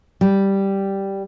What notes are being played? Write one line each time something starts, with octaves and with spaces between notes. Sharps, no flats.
G3